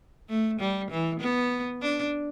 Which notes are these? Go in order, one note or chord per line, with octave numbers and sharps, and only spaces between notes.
A3
G3
E3
B3
D4